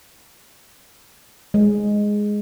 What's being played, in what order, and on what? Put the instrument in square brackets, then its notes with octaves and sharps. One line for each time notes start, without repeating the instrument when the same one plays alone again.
[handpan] G#3